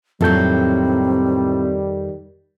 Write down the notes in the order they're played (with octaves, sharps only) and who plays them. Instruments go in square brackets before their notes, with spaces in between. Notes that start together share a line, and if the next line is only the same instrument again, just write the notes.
[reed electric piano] F2 A4 G6 [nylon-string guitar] A2 F#3 [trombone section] D#3 G3 [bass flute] C4